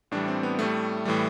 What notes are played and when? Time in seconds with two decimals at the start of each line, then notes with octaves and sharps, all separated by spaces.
0.11 A2 E3 G3 D4
0.28 C4
0.43 B3
0.59 A2 G3 A3
1.05 A2 E3 G3